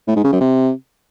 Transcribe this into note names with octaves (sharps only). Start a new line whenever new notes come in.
A2
G#2
C#3
F#2
C3